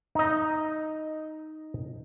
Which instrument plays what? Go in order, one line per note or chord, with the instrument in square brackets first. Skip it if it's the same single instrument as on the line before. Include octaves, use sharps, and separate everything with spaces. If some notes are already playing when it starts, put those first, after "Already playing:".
[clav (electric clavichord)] D#4 D#5